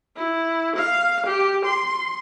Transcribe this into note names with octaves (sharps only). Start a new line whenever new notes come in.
E4
F5
G4
C6